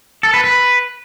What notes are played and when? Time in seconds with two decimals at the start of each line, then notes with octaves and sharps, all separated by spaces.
0.23 A4
0.34 B4
0.44 B4